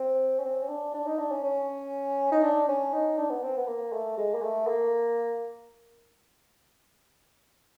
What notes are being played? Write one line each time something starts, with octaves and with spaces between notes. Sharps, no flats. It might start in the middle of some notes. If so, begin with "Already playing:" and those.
Already playing: C4
C#4
C4
C#4
D4
D4
D#4
D4
C#4
C#4
D#4
D4
C#4
D#4
D4
B3
C4
B3
A#3
A3
G#3
A#3
A3
A#3